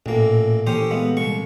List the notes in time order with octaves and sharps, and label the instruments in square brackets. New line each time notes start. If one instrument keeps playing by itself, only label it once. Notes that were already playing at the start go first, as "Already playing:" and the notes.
[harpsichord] A1 A#3 [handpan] A#2 A4
[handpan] E3 A#3 A4 [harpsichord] C#4 G4 C5
[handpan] G#3 D#5 F5 [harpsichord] B3
[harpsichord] C2 C#6